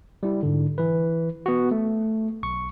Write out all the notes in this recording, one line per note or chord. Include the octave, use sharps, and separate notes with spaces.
G3 E4
G#2 D3
E3 B4
B3 F#4
A3
B1 C#6